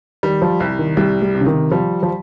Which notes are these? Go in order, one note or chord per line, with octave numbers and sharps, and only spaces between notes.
D#3 G3
F3
C2
D#3
C2 G3
G3
C3
C#3
D#3
F3 G3
F3